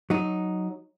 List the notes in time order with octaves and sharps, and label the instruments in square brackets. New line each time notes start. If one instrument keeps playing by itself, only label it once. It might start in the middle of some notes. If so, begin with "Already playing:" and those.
[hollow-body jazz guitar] F#3 D#4